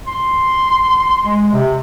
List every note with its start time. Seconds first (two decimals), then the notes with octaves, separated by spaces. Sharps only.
0.07 C6
1.23 G#3
1.53 C3